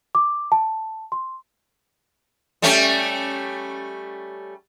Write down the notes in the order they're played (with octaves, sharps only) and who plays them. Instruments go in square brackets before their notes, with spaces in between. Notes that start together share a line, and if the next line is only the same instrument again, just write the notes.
[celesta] D6
A5
C6
[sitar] G3 A3 C#4